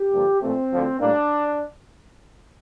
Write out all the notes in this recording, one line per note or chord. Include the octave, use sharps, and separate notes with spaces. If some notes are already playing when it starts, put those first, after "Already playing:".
Already playing: G4
G2 D3 F3 A#3
A#2 F3 A3 C4
D2 D3 F3
A2 G3 A#3 D4